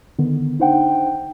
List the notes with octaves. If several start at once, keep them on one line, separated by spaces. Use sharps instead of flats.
D3 D#3 B3
D4 D#4 C5 F#5 G5